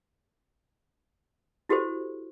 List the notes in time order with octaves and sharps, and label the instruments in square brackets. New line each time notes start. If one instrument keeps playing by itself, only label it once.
[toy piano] E4 F#4 G4 A4 C5